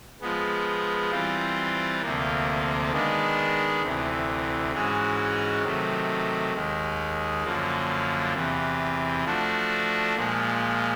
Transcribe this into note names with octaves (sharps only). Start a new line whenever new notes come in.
F3 G#3 B3
E3 G3 C4 F4
D2 C3 F3 A#3
D#3 G#3 B3 D4
D2 C3 E3
G#2 E3 G#3 C#4 F#4
C3 D#3 F#3 A3
D#2 D#3 G#3
F#2 D3 F3 A#3
E2 C3 E3
F3 A3 D4 F#4
A#2 F3 G#3